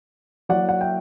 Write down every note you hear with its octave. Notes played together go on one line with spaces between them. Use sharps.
F#3 A#3 E4 D5 F#5
F#5
E5 G5